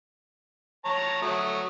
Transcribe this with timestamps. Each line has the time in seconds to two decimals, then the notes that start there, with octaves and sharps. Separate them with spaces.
0.85 C#5 A5 A#5
1.22 F#3 A3 D#6